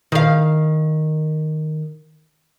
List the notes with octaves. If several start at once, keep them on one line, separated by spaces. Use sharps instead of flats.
D#3 F5